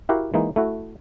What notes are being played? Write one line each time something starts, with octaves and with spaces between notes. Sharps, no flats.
E4 F#4 G4 A#4 F5 F#5
E3 G#3 A#3 D#4
A3 E4 F#4